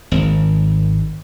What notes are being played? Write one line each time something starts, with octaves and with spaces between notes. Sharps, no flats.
G#1